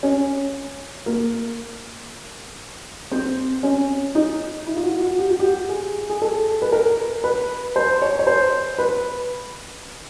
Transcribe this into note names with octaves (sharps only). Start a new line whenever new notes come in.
C#4
A#3
C4
C#4
D#4
E4
F4
F#4
F#4
G4
F#4
G4
G#4
G#4
A4
B4
A#4
B4
C5
C#5
C#5
C5
B4